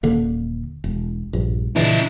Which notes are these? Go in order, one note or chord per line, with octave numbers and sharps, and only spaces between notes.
D#1 D3 A#3
E1
A#1 G2
A#2 C#3 E3 D4 E4